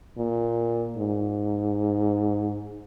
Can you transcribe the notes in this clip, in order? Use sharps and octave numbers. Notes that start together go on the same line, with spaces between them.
A#2
G#2